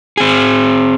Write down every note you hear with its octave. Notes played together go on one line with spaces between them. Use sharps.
C4 G#4